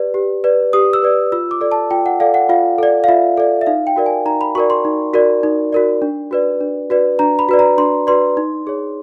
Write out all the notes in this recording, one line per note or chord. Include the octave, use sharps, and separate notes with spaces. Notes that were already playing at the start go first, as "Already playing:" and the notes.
Already playing: G4 B4 D5
G4
B4 D5
G4 D#6
E6
B4 D5
F4 E6
D6
A4 D5
A5
F4 G5
F#5
A4 D5 F5
F#5
F4 F5
A4 D5
F5
F4 E5
A4 D5
E5
D#4 F5
G5
F#4 A#4 D5
G#5
D#4 A#5
B5
F#4 A#4 D5 C#6
C6
D#4
F#4 A#4 D5
D#4
F#4 A#4 D5
D4
F#4 B4 D5
D4
F#4 B4 D5
D4 A#5
B5
F#4 B4 D5
A#5
D4 C6
F#4 B4 D5 C6
D#4
G#4 C#5